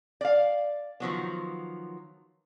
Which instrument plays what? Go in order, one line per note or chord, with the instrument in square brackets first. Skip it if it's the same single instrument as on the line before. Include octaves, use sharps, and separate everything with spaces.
[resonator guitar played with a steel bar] D5 F5
D#3 F3 F#3 B3